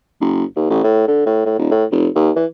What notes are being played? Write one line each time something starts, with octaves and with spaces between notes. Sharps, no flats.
F#1
D#2
A1
A2
D3
A2
A2
D#1
A2
F1
D#2
E3